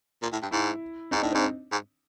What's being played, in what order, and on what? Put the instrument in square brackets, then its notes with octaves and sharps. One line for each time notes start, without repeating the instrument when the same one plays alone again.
[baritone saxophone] A#2
A2
G2
[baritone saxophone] G#2 [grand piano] E4
[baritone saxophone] G#2 [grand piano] D#4
[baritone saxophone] A2 [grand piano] D4
[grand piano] C4
[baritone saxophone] G#2
G#2